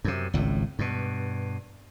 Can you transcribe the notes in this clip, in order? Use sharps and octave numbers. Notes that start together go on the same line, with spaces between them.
F#2 C3
G#1 C#2 A2
G2 B2